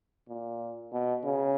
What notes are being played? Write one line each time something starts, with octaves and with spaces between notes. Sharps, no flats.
A#2
B2
C#3